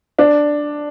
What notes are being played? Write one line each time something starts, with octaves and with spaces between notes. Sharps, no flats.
D4